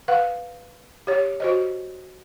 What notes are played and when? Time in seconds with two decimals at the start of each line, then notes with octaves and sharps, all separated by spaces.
0.08 B4 F5 F#5
1.07 G4 C#5
1.40 F#4 C5 D#5